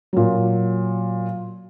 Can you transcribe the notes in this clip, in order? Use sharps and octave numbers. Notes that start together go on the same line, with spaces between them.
A#2 F#3